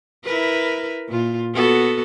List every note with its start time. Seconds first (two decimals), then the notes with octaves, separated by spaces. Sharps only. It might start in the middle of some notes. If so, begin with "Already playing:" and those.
0.24 E4 A#4 B4
1.08 A#2 F4
1.54 B3 F#4 A4